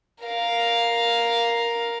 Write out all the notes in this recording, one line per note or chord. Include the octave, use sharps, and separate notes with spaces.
A#4 F5